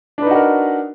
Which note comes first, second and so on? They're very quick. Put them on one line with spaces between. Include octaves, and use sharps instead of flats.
D4 B4 D#4 F#4 A#4